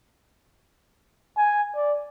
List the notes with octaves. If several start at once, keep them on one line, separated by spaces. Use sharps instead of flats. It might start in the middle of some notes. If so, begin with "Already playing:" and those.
G#5
D5